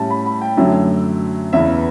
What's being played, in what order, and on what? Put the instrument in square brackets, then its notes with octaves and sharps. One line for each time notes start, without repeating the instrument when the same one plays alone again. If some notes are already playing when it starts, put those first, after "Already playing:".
Already playing: [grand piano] A2 G3 C#4 A5
B5
B5
G5
F#2 D3 F#3 A3
E2 C#3 E3 E5